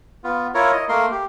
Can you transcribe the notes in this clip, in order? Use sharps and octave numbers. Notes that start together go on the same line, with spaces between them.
B3 F4
E4 F4 A#4 C#5
D#5
A3 A#3 A#4 C6
G4